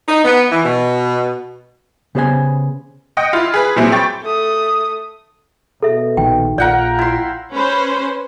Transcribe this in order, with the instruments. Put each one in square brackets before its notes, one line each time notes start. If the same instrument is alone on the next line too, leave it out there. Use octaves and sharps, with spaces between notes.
[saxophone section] D#4
B3
E3
B2
[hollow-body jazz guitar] C#3 B3 G4 C5 D5 G#5
[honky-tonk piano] D#5 F#5 G5 D#6
E4 F4
G#4 B4
A#2 F#3 G3 C4 E4 G#4
G5 C#6 A6
[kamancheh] A3 D#6
[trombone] B2 [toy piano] A4 E5
[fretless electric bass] A#1 D#3 [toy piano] G5
[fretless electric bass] A#1 [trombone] F4 [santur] A#4 F#5 G5 [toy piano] D5
[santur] E4 C6
[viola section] C#4 B4 C5